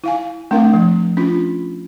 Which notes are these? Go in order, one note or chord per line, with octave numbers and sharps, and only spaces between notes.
E4 F5 G#5
A3 C4 D4 A#4 F5
F3
C#4 D4 F4